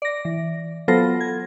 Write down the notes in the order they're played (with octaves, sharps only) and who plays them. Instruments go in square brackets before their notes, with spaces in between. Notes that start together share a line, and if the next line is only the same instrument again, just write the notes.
[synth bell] D5 A#6
E3
F#3 B3 F4 A4 C5 A#6
G#6